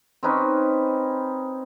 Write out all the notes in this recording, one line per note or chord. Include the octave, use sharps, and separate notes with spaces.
C4 C#4 D#4 B4